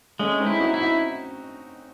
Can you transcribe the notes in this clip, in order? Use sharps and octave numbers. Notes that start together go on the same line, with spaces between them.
G#3 A3 C#4
C4 D#4
E4
D#4 F#4
E4
D#4 F#4